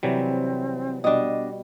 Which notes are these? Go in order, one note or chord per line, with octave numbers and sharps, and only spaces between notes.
C3 E3 F#3 G3 C4
B2 G3 B3 D4 D#5